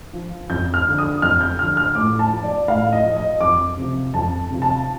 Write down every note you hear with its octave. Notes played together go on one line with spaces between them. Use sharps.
F3
F2 G6
F6
D3 F3
D#6
F2 F6
G6
D3 F3 F6
F6
A2 D6
A5
F3
D5
A2 F5
D#5
F3
D#5
F2 D6
C3 F3
F2 A5
C3 F3
A5